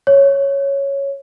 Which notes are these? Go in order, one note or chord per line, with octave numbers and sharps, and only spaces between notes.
C#5